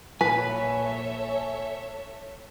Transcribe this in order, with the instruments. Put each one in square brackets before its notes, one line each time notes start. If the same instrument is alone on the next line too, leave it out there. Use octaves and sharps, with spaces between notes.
[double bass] A#1 [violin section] A4 C#5 E5 [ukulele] B4 [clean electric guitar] G#5